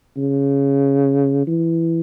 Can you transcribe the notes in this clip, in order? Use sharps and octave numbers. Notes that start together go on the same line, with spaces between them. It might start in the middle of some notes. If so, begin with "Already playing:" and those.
C#3
E3